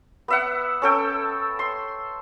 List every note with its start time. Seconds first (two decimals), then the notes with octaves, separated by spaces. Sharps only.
0.28 B3 E5 F#5
0.82 C#4 A4 G5
1.59 C6